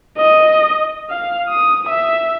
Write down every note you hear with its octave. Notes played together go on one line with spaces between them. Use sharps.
D#5
F5
D#6
E5